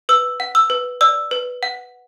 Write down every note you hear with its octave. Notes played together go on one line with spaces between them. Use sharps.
B4 E6
F#5
E6
B4
D5 E6
B4
F#5